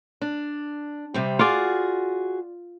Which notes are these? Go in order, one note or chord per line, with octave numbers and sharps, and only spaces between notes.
D4
C3 G3 C4
F4 F#4 G#4 D5